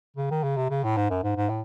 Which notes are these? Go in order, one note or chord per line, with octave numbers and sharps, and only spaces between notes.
C#3
D#3
C#3
C3
C#3
A2
G#2
F#2
G#2
G#2
A2